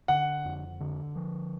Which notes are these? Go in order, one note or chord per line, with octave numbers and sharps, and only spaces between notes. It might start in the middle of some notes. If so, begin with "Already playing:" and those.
D3 F#5
F2
D3
F3